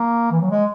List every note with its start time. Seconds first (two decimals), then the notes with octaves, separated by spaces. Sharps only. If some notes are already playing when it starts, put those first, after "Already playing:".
Already playing: A#3
0.31 E3
0.41 F#3
0.50 G#3